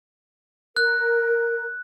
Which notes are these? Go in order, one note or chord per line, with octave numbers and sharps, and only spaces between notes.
A#4 F#6